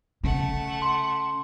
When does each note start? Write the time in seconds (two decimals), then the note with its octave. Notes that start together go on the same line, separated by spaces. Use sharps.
0.23 C#3 A3 F#5
0.82 C6